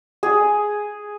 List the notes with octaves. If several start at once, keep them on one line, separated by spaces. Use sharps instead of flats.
G#4